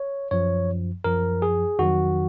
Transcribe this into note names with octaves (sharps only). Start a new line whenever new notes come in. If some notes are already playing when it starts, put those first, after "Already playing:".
Already playing: C#5
F#2 F3 C#5
F#2 F3 A#4
G#4
F2 D#3 F#3 F#4